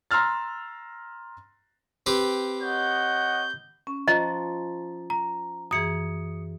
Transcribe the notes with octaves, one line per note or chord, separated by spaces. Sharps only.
A#5 C6 E6 F6 A6
C4 G4 B4
C#5 D#5 F#5 G6
C#4
F3 C5 D#5 A#5 A6
A#5
F#2 E3 G#4 D#6 C#7